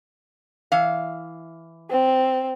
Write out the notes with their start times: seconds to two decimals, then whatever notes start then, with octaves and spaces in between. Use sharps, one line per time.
0.72 E3 F5
1.91 C4